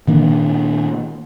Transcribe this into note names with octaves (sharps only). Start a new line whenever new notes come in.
A#2 D#3 A#3 D4